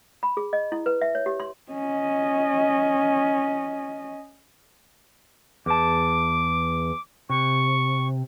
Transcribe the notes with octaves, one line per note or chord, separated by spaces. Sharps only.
B5
G#4
D#5
E4
B4
E5
C#5
G4
C6
C#4 D#5
E2 A5 D6
C3 C#6